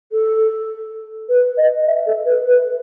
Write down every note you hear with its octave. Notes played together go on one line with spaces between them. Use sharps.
A4
B4
D#5
E5
A4
B4
B4